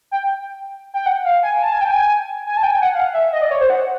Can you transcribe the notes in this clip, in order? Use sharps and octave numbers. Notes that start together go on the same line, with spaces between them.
G5
G5
F#5
F5
G#5
A5
G#5
G5
G#5
G#5
A5
G5
G#5
F#5
F5
E5
D#5
D5
C#5
C5
F#5